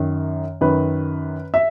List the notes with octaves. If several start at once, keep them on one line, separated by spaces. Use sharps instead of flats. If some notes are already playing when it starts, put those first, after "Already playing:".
Already playing: F#2 D#3
F#2 D#3 B4
E5